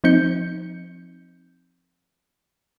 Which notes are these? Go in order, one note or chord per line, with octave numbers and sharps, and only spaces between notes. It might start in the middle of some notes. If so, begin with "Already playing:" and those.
F3 C4 D#4 G6 C#7